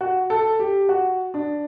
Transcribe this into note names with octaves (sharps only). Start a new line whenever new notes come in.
F#4
A4
G4
F#4
D4